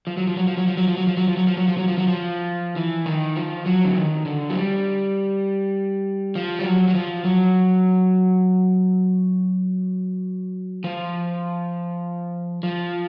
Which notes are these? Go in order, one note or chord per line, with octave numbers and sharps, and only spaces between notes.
F3
F#3
F3
F#3
F3
F#3
F3
F#3
F3
F#3
F3
F#3
F3
F#3
F3
F#3
F3
F#3
F3
F#3
F3
E3
D#3
F3
F#3
D3
D#3
D3
F#3
G3
F3
G3
F#3
F#3
F3
F#3
F3
F3